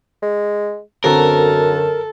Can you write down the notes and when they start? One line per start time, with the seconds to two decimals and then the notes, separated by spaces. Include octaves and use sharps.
0.22 G#3
1.04 F#2 D3 C4 F#4 A4 A#4